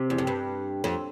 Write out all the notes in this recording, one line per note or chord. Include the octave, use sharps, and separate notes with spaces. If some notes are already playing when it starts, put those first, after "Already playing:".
Already playing: C3
E2
F2
G2
F2